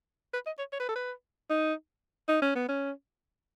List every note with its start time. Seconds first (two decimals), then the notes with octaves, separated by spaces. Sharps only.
0.33 B4
0.46 D#5
0.58 C#5
0.72 C#5
0.80 B4
0.88 A4
0.95 B4
1.50 D#4
2.28 D#4
2.42 C#4
2.55 B3
2.68 C#4